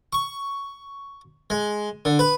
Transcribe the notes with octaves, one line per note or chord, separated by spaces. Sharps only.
C#6
G#3
D3
B4